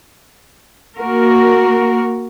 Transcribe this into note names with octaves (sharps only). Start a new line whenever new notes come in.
A#3 F#4 A#4